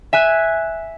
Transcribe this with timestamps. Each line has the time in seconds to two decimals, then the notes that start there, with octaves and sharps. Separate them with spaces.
0.13 E5 G#5 F#6